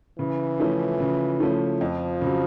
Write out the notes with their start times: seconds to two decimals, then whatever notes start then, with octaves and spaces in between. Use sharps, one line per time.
0.19 C#3 E3
0.60 F3 A3 C#4 E4
1.00 C#3
1.40 F3 A3 C#4 E4
1.81 F2 F3
2.21 C#3 F#3